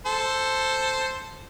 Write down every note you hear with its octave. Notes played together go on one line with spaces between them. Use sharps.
A4 C5